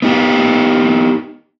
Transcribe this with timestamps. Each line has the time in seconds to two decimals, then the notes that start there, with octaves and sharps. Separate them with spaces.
0.02 B3 D#4 G4